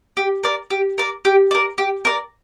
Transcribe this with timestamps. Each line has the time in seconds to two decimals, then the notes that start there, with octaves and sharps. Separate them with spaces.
0.17 G4
0.43 A#4 D5
0.70 G4
0.98 A#4 D5
1.25 G4
1.51 A#4 D5
1.78 G4
2.05 A#4 D5